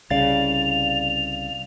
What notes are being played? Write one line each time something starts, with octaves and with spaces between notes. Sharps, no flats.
C2 C#3 D5 F5 A6 F7